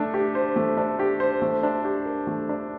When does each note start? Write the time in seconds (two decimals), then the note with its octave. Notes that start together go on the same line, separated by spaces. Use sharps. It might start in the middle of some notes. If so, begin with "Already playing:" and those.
Already playing: A3 D4
0.14 G4
0.35 C5
0.56 A3
0.77 D4
0.99 G4
1.20 C5
1.42 A3
1.63 D4
1.85 G4
2.06 A#4
2.27 A3
2.49 D4